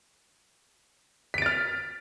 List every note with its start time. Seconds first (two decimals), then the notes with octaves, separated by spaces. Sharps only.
1.34 B6
1.38 D7
1.42 A6
1.46 F6